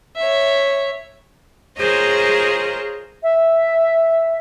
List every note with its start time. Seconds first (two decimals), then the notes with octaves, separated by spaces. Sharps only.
0.16 C#5 E5
1.77 F4 G#4 A#4 C5 C#5 D#5
3.23 E5